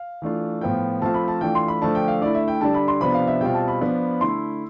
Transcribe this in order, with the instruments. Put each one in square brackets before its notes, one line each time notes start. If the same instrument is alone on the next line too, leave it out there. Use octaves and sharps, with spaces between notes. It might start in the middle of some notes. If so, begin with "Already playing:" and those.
Already playing: [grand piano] F5
E3 A3 D4 F4
A2 F3 B3 F4 G5
F3 A3 C4 F4 A5
B5
A5
E3 A3 D4 F4 G5
C6
B5
D3 F3 A3 D4 A5
G5
F5
D3 A3 E4 D5
E5
G5
D3 G3 D4 A5
B5
C6
C3 F3 B3 D4 B5
F5
E5
B2 G3 C4 F4 G5
A5
B5
F3 B3 D4 F4
D3 A3 E4 C6